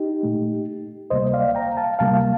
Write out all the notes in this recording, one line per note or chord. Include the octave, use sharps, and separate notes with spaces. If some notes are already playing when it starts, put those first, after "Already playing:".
Already playing: D#4 G4
A#2 A3
D2 C3 G3 A#3 C5 D#5
D5 F5
G5 A#5
F5 A5
D2 C3 G3 A#3 F5 A5